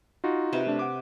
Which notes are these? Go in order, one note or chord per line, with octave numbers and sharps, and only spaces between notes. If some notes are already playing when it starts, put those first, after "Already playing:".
D#4 F4 F#4
C3 B4 C5
A3 D4
F#5 D6